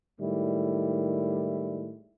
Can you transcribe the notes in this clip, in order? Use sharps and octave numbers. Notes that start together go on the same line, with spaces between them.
A2 D#3 G3 G#3 E4